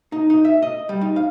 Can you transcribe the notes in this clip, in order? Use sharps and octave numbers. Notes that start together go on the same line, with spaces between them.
D#4
D#4
E5
D#5
G3
D#4
F5